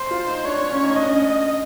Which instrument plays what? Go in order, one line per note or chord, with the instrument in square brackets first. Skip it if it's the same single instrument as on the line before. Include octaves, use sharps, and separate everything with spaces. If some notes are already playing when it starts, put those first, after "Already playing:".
Already playing: [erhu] C5
[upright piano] F4
D#4
[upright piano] D4 [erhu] C#5
[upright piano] D4
C#4
D#4
[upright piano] D4 [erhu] D#5
[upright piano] C#4
D4